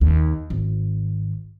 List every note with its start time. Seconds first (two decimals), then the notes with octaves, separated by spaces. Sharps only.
0.01 D#2
0.50 G#1